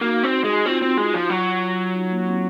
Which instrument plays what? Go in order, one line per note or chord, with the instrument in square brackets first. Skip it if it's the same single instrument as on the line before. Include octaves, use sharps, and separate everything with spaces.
[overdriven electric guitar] A#3 [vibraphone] D#4 F#4
[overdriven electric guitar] C4
G#3
[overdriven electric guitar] C4 [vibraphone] F4
[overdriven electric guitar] C4
G#3
F3
F#3
[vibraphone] D#4
A#3
C4